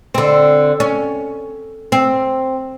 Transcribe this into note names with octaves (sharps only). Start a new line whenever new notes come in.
D3 C4
C#4
C4